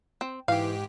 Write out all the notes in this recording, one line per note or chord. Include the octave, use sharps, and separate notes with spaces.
C4
G#2 E3 G4 F5